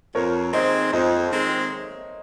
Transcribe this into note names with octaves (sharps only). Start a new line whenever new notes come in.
F2 A#4 C#5
D#3 G#3 C4 C5 D#5
F2 C5 D#5
D#3 G#3 C4